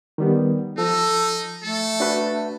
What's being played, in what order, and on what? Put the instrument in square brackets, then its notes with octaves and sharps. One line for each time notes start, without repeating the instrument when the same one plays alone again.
[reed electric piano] D#3 G3 B3
[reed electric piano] F3 [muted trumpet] D#4 [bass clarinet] A4
[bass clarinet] A3 [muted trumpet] A4
[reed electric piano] D4 F#4 B4